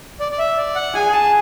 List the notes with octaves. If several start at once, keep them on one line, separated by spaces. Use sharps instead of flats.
D5
D5
E5
D5
F#5
G#4 G#5
A5